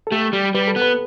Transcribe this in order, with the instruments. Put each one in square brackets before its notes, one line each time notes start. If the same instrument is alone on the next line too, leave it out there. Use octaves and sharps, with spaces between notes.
[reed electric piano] A4
[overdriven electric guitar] A3 [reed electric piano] G4
[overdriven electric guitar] G3
[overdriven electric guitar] G3 [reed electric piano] B4
[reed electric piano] A4
[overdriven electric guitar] B3
[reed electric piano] B4